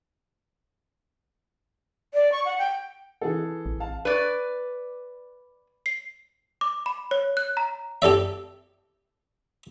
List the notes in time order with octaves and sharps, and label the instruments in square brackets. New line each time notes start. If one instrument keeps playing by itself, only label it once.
[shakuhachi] D5
C#6
F#5
G5
[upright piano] E3 G#4 A4
[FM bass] A1
[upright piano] F5 A5
[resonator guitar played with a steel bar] B4 D5
[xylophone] C7
D6
B5
C#5
F#6
A#5
[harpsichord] G4 A4 D5 E5